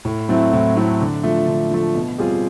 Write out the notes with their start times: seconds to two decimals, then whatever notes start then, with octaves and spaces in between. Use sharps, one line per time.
0.05 A2
0.29 F#3 A3 C4 E4
0.53 A2
0.76 F#3 A3 C4 E4
1.01 D3
1.23 F3 A3
1.47 D3
1.71 F3 A3
1.95 B2
2.18 G3 C4 F4 G#4